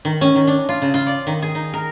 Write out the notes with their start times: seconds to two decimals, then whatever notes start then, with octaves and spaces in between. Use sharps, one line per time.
0.05 D#3
0.21 C#4
0.36 D#3
0.47 D4
0.69 F4
0.82 C#3
0.94 F4
1.07 D5
1.27 D#3
1.42 G#4
1.55 D#4
1.74 A#4